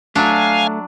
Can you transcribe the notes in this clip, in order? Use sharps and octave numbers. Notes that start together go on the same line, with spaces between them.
F#3 A3 D4 F5 G#5